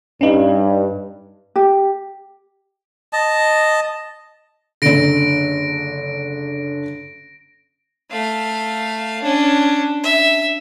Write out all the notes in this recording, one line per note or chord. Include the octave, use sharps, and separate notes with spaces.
G2 C#4 D#4
G4
D#5 A5
F#1 D3 A#6 D7
A3 F5
C#4 D4
E5